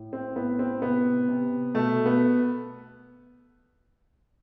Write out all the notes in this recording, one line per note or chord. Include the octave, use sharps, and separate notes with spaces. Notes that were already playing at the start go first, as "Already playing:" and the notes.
Already playing: A2
C4
A2 B3
C4
C3 B3
C3
B2 A3
B3